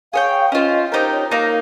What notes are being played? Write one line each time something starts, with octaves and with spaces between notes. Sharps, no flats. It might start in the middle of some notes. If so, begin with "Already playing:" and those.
G#4 C#5 F5 G5
C#4 F4 C5 D#5
D#4 G4 A#4 C5
C#5
A#3 D#4 A#4 F5